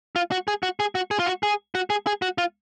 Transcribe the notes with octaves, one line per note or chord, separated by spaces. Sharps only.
F4
F#4
G#4
F#4
G#4
F#4
G#4
F4
F#4
G#4
F#4
G#4
G#4
F#4
F4